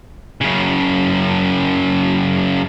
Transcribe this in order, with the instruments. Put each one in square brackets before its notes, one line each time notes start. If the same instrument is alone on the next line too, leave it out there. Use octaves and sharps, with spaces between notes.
[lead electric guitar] F#2 C#3